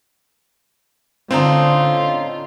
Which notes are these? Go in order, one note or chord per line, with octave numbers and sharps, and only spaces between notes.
A2 D3 C4 C#4 D#4 F4